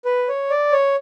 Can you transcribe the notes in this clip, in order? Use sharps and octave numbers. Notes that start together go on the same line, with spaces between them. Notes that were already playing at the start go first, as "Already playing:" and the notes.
B4
C#5
D5
C#5